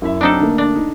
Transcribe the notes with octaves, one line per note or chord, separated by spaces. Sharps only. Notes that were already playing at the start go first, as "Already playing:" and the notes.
F#2 E4 E5
F#3 C4 D4 D#4 A4
D3 A3 A#3
D4
D#4